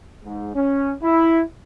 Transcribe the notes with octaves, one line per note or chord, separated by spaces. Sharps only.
G#2
C#4
E4